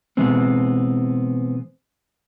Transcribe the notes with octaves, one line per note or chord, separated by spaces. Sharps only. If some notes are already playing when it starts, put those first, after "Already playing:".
B2 E3 G#3 B3 C4